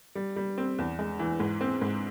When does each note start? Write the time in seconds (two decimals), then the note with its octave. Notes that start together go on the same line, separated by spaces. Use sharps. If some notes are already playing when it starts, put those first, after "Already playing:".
0.15 G3
0.36 G3
0.58 C4
0.78 E2
0.99 G#3
1.19 E3
1.40 G#2
1.61 C4
1.81 G#2